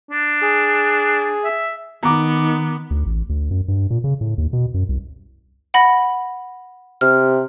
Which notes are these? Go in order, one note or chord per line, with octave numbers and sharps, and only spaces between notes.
D4
G#4
E5
D#3 B3 A#5 D6
D2
A1
D2
F#2
G2
A#2
C#3
A2
D#2
B2
F#2
C2
F#5 B5 A#6
C3 F6